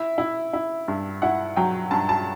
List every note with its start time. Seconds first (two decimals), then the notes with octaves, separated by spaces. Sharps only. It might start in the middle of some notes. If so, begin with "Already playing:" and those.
Already playing: E4 E5
0.18 E4
0.53 E4
0.88 G2
1.22 E4 F#5
1.56 F#3 G5
1.91 G2 A5
2.09 A5